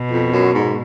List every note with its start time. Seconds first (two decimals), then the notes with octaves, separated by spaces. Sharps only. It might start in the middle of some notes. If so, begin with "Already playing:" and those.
Already playing: B2
0.11 F2
0.32 F#2
0.54 G#2